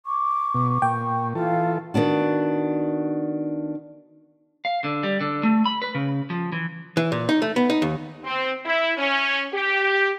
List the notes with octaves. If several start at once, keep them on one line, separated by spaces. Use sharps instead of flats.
C#6 D6
B2
A#2 G5
E3 F4 A4 F5
D#3 B3 D4 F#4
F5
D3
G3
D3
A3
B5
B4
C#3
F3
E3
E3
A#2
D#4
A3
B3
D#4
D#2
C4
E4
C#4
G4